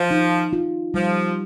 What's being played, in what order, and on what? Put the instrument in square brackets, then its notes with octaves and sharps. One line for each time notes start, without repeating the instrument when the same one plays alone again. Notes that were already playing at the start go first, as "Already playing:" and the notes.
Already playing: [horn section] F3
[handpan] D#4
F4
[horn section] F3 [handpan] G3